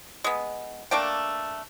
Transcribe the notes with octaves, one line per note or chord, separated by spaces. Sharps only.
G#3 B3
A3 A#3 D4 G5